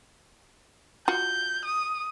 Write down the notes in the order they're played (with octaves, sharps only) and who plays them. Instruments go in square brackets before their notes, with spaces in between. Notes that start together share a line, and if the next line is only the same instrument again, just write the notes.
[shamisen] F4 F#4 [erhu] G6
[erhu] D#6